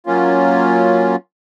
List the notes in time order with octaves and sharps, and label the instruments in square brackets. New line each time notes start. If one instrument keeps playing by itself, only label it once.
[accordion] F#3 A#3 C#4 F4